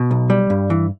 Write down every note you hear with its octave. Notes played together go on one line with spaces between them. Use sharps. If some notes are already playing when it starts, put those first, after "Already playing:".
Already playing: B2
B1
G3
G2
E3